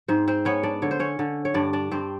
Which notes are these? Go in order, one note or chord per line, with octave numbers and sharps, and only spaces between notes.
G#2 C4 C5
C4 C5
B3 C#4 C#5
D4 D5
D3 C#5
C5
C#4 C#5
D3
C#5
G2 D4 D5
D4 D5
G2 C4 C5